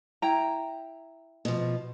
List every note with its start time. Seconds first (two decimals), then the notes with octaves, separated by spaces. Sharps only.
0.22 E4 G5 A#5
1.45 B2 F3